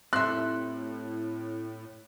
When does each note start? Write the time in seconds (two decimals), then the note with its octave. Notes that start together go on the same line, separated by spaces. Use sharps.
0.13 A2 C4 G4 A4 E5 C6 F#6